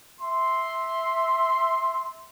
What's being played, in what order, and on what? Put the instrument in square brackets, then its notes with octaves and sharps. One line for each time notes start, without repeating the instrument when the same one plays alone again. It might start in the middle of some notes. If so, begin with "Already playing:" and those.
[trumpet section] E5 C6